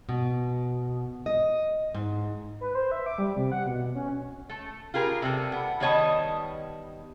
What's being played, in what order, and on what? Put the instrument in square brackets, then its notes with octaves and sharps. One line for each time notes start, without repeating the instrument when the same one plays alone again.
[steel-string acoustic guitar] B2
D#5
G#2
[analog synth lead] B4
C5
E5
D6
G3
C3
F#5
B2
C#4
[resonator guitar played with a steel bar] A3
F4 G4 G#4 A#4
C3 G3 A4
B3
D#3 G3 B3 C#5 D#5 A5